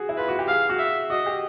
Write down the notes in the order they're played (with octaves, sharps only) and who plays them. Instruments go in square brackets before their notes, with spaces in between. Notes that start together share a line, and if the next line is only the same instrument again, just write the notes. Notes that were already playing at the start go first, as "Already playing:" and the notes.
Already playing: [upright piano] F#4 G#4
E4
[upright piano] F4 [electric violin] B4
[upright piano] F#4
G4
[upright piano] G#4 [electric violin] F5
[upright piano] F#4
[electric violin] E5
[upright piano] F#4 [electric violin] D#5
[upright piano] G4